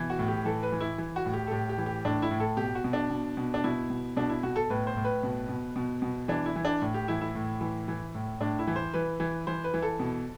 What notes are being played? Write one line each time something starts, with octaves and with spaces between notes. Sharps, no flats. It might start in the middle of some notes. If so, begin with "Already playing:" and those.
Already playing: B2 E3
F#4
A2
G4
E3 A4
B4
E3
E4
E3
F#4
A2
G4
A4
A2 G4
G4
E3
G4
A2 D4
E4
A2
A4
B2 G4
F#4
B2
D4
B2
B2
D4
B2 E4
B2
B2 D4
E4
B2 F#4
A4
A2 B4
C5
A2
B4
B2
B2
B2
B2
E3 D4
E4
E3
D4
A2
G4
E3 E4
E4
A2
E3
E3
A2
A2 D4
E4
E3
C5
E3 B4
E3
E3 C5
B4
E3
A4
B2